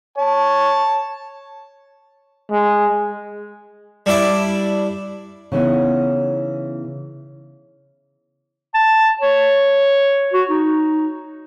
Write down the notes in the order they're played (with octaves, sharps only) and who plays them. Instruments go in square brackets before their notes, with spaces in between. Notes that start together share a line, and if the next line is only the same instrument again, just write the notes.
[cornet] C#5 [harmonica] A5
[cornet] G#3
[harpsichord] G3 D4 E4 D5 E5
[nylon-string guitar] C#3 E3 B3 D#4
[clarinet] A5
C#5
F#4
D#4